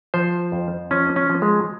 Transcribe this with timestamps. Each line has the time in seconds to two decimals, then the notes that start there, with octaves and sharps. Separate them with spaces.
0.14 F3 C5
0.52 F2
0.91 F3 C#4
1.16 C#4
1.30 F3
1.42 G#3